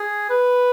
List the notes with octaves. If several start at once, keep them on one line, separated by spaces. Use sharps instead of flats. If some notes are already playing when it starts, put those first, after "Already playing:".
Already playing: G#4
B4